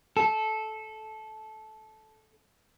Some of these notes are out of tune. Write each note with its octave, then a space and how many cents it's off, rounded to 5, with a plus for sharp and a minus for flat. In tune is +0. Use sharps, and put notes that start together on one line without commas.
A4 -15